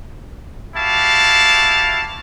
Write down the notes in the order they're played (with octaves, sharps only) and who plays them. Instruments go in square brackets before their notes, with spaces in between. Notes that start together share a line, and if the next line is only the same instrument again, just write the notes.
[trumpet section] E4 F#4 G4 F5 A5